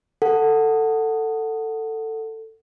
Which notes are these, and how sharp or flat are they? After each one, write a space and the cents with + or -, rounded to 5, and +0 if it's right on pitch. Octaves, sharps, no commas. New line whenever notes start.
A4 +15 F#5 +0